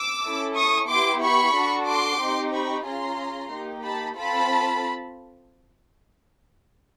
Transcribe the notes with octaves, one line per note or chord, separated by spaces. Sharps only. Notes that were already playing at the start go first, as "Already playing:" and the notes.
Already playing: D6 E6
C#4 E4 A4
C#6 D#6
B3 E4 G4 C6 D6
B5 C#6
D4 F#4 A4
C6 D6
C4 D#4 G4
B5 C#6
C#4 F4 G#4 A#5 C6
A#3 D#4 G4
A5 B5
C4 F4 A4 A5 B5